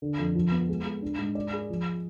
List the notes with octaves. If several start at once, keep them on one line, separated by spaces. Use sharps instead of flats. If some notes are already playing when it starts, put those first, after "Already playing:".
D3
F2
F3
B3
G#3
G#3
D4
G#2
D5
G#4
F3